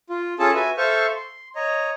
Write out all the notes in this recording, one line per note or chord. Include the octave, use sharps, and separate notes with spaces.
F4
C#4 F4 G#4 A4 A5
F#4 B4 E5 G#5
A4 C5 E5 F5 C#6
C6
C#5 D#5 A#5